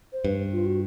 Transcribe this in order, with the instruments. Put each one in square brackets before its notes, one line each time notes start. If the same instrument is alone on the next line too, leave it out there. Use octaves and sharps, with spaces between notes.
[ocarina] C5
[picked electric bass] G2 [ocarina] B4
[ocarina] F4
F#4